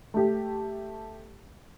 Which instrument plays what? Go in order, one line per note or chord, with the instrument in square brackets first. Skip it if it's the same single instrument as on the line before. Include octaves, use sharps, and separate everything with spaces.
[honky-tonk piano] A3 G4